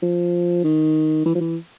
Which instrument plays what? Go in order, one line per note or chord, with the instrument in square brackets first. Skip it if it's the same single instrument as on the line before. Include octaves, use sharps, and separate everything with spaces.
[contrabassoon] F3
D#3
E3
F3
E3